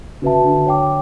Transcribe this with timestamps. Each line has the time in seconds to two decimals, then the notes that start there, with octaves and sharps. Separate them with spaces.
0.22 C#3 F#4 B4 E5 A5
0.44 D3
0.67 C#5 G5 D6